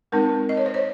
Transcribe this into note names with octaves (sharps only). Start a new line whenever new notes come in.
G#3 C4 D#4 A#4
D#5
C#5
C5
C#5